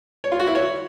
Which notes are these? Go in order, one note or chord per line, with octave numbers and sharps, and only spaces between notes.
C#5
F4
F#4
E4
C#5